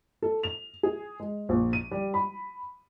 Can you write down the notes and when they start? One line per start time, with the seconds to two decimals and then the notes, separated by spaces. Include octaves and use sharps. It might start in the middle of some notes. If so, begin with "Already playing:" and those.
0.22 A4
0.43 F7
0.83 G#4
1.20 G#3
1.49 A#1
1.73 D#7
1.91 G3
2.14 B5